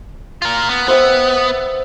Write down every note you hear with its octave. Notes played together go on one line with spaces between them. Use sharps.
F4 A#4
B3
B3 C5 E5 G5